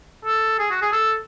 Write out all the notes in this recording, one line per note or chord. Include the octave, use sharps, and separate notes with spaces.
A4
G#4
F#4
G#4
A4